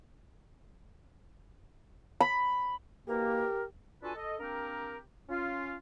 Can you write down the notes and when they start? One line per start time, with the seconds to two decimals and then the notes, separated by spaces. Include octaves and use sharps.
2.21 B5
3.08 B2 E3 A#3 G4 A#4
4.03 D4 F4 F#4 A4 B4 G#5
4.15 A4 D#5
4.40 A#3 C4 D4 G4 A#4
5.28 C#4 F4